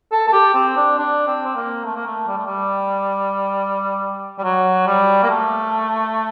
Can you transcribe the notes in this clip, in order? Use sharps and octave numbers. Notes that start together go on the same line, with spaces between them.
A4
A4
G4
C4
D4
D4
C4
C4
A#3
A3
A#3
A3
G3
A3
G3
G3
F#3
G3
A#3
A3